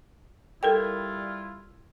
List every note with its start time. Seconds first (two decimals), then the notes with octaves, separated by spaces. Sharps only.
0.63 G3 E4 F4 A4 A#4 G5